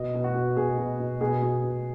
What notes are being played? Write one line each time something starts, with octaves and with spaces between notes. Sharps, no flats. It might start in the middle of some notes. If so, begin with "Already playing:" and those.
Already playing: B2 D#5
B2
F#4
B2
B2 G#4
B2
B2
B2 G#4
B2
B2